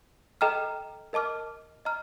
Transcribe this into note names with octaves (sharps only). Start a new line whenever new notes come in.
A4 D#5 G5 A#5 F6
A#4 D#5 A5 D6 F6
D#5 A#5 F6